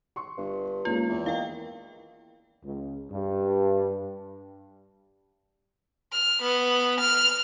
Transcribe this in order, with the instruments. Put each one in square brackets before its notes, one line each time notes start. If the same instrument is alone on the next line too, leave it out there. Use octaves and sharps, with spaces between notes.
[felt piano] C6 C#6
[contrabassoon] G1 [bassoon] G2
[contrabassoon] D#2 [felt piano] G#3 A#3 C#4 [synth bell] F4
[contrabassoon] E2
[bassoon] D#3 [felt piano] E4 [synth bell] F5 G5
[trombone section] C#2
G2
[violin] F6
B3
F6